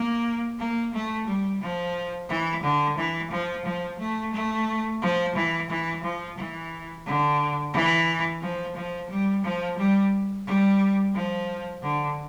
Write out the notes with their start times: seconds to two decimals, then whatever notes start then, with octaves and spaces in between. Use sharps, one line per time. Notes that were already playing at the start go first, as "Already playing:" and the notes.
Already playing: A#3
0.59 A#3
0.93 A3
1.27 G3
1.61 F3
2.29 E3
2.63 D3
2.97 E3
3.31 F3
3.65 F3
3.99 A3
4.33 A3
5.01 F3
5.35 E3
5.69 E3
6.03 F3
6.37 E3
7.06 D3
7.74 E3
8.42 F3
8.75 F3
9.10 G3
9.44 F3
9.78 G3
10.46 G3
11.14 F3
11.82 D3